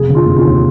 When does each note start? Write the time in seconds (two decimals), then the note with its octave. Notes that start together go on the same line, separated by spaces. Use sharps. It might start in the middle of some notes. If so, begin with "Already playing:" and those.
Already playing: F1 G#4
0.09 D3
0.15 F4
0.26 F1
0.38 F4
0.44 D#2